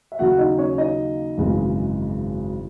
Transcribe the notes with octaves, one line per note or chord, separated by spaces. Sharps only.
E5
D#2 C#3 F#3 A#3 F#4 F#5
D#4 D#5
C#4 C#5
D#4 D#5
G#1 F#2 C#3 E3 G#3